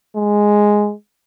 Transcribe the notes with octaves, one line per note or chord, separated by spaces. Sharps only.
G#3